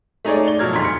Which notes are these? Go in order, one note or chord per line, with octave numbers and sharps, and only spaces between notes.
A3 D#4 G#4 C#5 D5
G7
B2 F3 F#3 F6 G#6
F1 D2 G#2 C6 B6
C#7